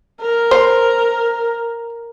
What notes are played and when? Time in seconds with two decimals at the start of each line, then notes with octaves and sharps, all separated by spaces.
0.21 A#4
0.51 C5